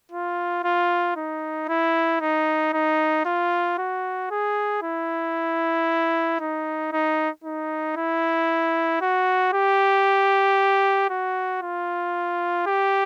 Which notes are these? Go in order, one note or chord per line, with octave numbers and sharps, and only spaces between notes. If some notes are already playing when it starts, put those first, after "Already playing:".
F4
F4
D#4
E4
D#4
D#4
F4
F#4
G#4
E4
D#4
D#4
D#4
E4
F#4
G4
F#4
F4
G4